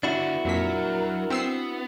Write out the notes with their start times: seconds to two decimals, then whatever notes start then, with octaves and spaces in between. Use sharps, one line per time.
0.03 D3 B3 D4 E4 F#4
0.45 F2 A#2 F#3 A#4 B6
1.30 B3 C4 E6 C7